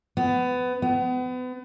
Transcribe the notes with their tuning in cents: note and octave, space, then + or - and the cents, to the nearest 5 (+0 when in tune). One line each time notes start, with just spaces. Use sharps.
B3 +20
B3 +35